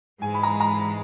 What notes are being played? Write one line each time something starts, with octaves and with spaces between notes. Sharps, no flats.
G#2 E3 G#3 G#5
B5
A#5
A#5
B5